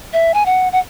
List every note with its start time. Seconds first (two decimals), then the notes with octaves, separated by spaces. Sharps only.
0.13 E5
0.34 G#5
0.46 F#5
0.73 F#5